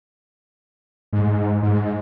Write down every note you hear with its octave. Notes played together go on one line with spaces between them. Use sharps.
G#2
G#2